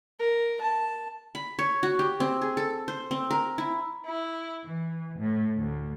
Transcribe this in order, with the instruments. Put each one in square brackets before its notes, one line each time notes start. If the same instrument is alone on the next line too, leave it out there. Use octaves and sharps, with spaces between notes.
[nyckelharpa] A#4
A5
[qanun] B5
C#5
F#4
G4
C4
G#4
A4
C5
C4
A#4
E4
[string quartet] E4
E3
A2
D2